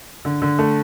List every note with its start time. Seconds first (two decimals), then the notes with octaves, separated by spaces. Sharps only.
0.25 D3
0.42 D3
0.59 A3